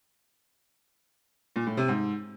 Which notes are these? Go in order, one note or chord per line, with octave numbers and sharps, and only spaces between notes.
A#2
A2
C3
G#2